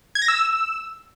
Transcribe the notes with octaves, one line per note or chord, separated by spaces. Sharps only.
G#6
A#6
E6